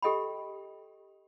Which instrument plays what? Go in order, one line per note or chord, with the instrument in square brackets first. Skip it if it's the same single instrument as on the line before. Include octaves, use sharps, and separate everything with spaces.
[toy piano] G4 A4 D#5 G5 B5